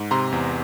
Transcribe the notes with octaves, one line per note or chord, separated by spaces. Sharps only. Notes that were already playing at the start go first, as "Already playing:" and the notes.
Already playing: G#2
C3 A#5 C6
E2